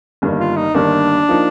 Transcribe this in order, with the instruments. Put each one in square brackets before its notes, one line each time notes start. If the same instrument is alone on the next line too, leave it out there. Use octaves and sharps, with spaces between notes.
[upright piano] G1 G2 D#3 A#3
[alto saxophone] F4
D#4
[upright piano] G1 G2 D#3 A#3 [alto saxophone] D4
[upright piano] F3 A#3 D#4